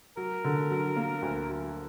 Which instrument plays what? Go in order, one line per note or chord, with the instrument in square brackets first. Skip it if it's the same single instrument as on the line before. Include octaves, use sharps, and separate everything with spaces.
[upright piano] F#3 [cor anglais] A#4
[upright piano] D3
F#3
A#3
D2
F#3